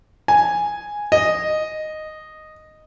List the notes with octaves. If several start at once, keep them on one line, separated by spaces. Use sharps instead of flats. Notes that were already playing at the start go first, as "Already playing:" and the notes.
G#5
D#5